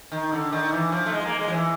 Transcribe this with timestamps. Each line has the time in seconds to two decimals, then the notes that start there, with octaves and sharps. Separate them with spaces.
0.12 D#3
0.32 D3
0.52 D#3
0.72 E3
0.92 F3
1.06 A3
1.12 G#3
1.26 A#3
1.39 G#3
1.48 F3
1.53 E3